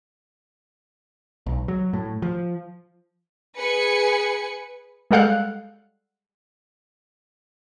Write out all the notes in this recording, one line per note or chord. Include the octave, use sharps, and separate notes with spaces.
B1
F#3
A2
F3
G#4 B4 G#5 C#7
G3 G#3 A4 F5 F#5 F#6